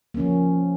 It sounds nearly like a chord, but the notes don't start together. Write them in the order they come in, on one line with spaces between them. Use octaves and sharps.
A#3 C#4 F3